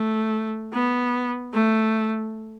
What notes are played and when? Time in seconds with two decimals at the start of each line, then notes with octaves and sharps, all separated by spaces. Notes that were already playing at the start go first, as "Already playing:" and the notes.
Already playing: A3
0.73 B3
1.53 A3